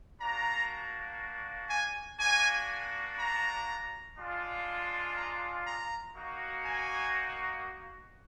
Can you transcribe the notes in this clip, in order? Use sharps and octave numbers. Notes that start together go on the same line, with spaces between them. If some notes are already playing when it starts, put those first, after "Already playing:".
A#3 D4 F#4 A#5
G#5
A#3 D4 F#4 G#5
A#5
G#3 D4 F4
A#5
A#5
A#3 D#4 F#4
G#5